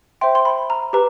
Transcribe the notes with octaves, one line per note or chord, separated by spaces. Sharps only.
C5 E5 G5 C6
C6
B5
A#5
G4 B4 A#5